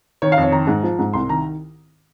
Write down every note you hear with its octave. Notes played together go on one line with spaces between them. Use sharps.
D#3 C#5
F5
F2 C#5
D#3 A#5
G#2
F3
G#2
C2 C6
D#3 A#5